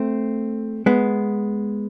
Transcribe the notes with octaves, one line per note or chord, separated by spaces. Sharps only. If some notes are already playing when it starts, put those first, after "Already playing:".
Already playing: A3 C4
G#3 B3